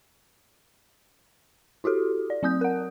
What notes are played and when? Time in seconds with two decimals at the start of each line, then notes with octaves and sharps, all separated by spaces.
1.84 E4 F#4 G4 A4
2.30 D5
2.43 F#3 C4 D#6 G6
2.61 A#4 F#5